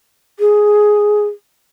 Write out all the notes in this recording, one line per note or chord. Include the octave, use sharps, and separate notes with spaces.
G#4